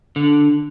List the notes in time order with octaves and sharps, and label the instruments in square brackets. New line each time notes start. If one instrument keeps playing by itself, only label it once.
[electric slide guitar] D3